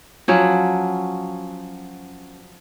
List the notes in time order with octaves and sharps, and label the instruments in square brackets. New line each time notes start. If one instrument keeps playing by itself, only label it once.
[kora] F3 F#3 C#4